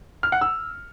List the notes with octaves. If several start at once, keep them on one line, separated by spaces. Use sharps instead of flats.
F6
F#5
E6